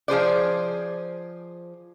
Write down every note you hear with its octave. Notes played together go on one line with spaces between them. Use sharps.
F3 G#4 C5 D5